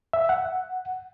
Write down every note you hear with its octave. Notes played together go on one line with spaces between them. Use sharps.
E5
F#5